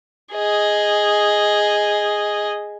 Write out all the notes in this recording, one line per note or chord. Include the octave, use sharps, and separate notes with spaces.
G#4 D#5